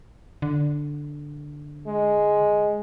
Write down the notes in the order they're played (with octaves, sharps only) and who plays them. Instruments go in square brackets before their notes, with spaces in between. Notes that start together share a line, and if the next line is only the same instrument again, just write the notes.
[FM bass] D3
[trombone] G#3